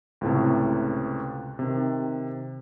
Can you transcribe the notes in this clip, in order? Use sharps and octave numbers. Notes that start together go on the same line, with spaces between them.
C#2 A2 C3
C3 D#3